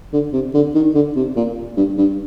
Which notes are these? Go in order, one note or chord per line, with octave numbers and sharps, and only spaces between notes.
D3
C3
D3
D#3
D3
C3
A#2
G2
G2